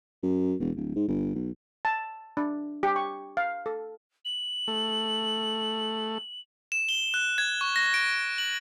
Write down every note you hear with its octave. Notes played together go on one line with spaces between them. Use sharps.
F#2
E1
D1
G#2
G1
B1
A5
D4
G4
C#6
F5
A4
F#7
A3
E7
G7
F#6
G#6
C#6
A#6
D7
F#7